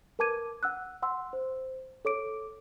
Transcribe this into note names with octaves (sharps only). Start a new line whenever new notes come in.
A#4 B4 A5 D6 G#6 D#7
F#5 E6 F#6
F#5 C6 E6
C5
A4 C#5 D6 D7